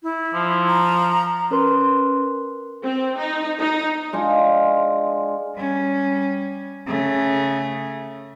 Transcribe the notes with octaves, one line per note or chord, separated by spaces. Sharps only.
E4
F3
A#5
C#4 A#4 B4 C6
C4
D#4
D#4
G#3 D4 F4 G#4
G3 C#4
C#3 A3